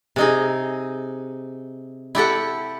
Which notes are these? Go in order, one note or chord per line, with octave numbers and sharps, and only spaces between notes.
C3 D#4 G#4
E4 G4 A4 F#5